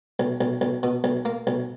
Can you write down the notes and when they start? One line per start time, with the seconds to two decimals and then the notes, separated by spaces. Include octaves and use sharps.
0.20 B1
0.41 B1
0.61 B1
0.83 B2
1.04 B1
1.25 A#3
1.47 B1